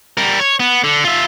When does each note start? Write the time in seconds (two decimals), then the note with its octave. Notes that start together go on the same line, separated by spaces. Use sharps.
0.17 G3 A#4
0.40 C#5
0.60 B3
0.84 D3
1.04 F4 E5